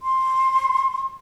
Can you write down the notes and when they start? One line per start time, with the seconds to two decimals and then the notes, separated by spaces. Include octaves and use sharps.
0.02 C6